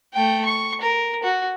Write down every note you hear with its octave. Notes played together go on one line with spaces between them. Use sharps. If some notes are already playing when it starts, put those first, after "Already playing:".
A3 G5
C#6
A#4
F#4